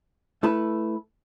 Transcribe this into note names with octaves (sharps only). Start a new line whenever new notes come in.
A3 E4 A4 B4